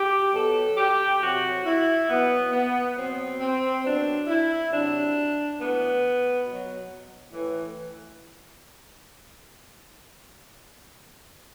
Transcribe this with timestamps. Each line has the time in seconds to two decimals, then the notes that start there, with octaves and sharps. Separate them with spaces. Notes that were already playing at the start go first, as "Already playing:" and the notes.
Already playing: G4
0.32 B2 F#3 A4
0.76 G4
1.19 C3 F#3 F#4
1.64 E4
2.07 B2 F#3 B3
2.51 B3
2.95 B2 F#3 C4
3.39 C4
3.82 B2 F#3 D4
4.26 E4
4.70 C3 F#3 D4
5.57 A2 E3 B3
6.45 B2 F#3
7.32 A2 E3